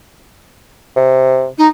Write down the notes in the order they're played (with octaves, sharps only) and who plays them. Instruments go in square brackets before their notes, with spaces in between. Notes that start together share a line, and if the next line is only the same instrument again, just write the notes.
[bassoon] C3
[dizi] D#4